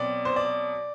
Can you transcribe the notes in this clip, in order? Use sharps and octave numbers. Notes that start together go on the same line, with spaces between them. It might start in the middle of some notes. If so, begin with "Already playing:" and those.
Already playing: B2 F#3 C4 D5
C5
D5